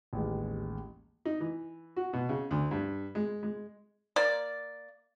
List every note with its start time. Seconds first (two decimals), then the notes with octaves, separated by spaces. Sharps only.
0.13 A1 D#2 G#3
1.25 D#4
1.40 E3
1.96 F#4
2.13 B2
2.29 C#3
2.51 D2
2.71 G2
3.15 G#3
3.43 G#3
4.16 A#3 D5